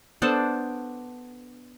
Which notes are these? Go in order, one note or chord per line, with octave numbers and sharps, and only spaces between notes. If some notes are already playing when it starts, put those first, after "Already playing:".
B3 D4 A4 C5